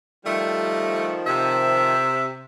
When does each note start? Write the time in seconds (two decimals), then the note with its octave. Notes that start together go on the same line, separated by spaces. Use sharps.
0.25 D#3 F3 G3 A3
1.27 C3 E5